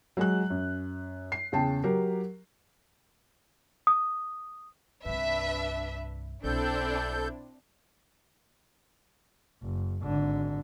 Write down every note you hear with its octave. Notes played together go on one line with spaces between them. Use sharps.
F#3 G#3 F#6
F#2
C7
E2 C#3 G5 A5
F#3 G4 A#4
D#6
C2 G2 D4 B4 E5
B1 C4 D4 E4 A4 G6
F#1
G#1 D3